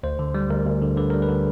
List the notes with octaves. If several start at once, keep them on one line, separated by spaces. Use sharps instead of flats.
D2 C5
D3
G3
D2 A#4
D2
D3
D3 B4
G3 A#4
B4
D3